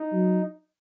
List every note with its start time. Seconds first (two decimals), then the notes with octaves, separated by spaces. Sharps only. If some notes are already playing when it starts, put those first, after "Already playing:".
Already playing: D#4
0.12 F#3